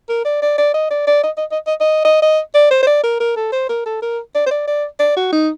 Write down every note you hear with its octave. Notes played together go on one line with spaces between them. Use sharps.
A#4
D5
D5
D5
D#5
D5
D5
D#5
D#5
D#5
D#5
D#5
D#5
D#5
D5
C5
C5
D5
A#4
A#4
A4
C5
A#4
A4
A#4
D5
C5
D5
D5
D5
F#4
D#4